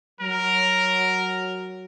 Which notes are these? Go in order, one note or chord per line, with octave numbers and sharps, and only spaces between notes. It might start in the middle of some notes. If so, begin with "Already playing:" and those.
F#3 A#4